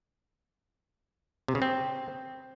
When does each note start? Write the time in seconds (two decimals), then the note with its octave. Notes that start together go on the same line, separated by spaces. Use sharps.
1.48 C3
1.55 C#3
1.62 C4